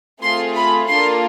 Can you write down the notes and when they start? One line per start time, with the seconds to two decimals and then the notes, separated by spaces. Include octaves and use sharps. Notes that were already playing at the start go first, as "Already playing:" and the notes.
0.23 A3 C4 F4 G#4 C6
0.56 B5
0.89 A#3 D4 F4 A4 C6